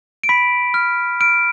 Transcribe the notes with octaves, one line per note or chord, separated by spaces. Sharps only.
D7
B5 B6
F6
F6 D7